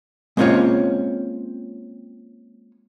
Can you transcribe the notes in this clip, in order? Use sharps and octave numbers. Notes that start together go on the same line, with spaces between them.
G#3 A#3 C4 C#4 F4 C#5